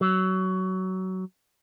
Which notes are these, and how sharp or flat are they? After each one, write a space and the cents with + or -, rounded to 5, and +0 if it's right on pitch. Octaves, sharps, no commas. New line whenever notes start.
F#3 +20